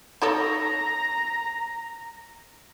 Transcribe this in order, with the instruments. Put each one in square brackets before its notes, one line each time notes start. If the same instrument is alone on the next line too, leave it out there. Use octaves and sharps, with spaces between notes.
[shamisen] D#4 A4 C#5 [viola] A#5